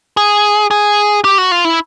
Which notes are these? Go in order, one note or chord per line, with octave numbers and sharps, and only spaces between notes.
G#4
G#4
G4
F#4
F4
E4